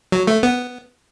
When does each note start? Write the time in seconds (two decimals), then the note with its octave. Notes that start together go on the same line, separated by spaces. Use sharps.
0.12 F#3
0.27 A3
0.43 B3